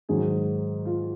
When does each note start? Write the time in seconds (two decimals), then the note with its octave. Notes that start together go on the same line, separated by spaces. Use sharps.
0.09 G#2 D#3 F#3 G#4
0.85 F4